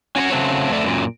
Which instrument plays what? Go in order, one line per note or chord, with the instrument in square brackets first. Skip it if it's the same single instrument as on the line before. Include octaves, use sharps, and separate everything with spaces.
[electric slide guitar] C#4 F#4 C5 C#5
C#3 F#3 A3 C4
F2 A3 A4 D5 E5
F#2 A#2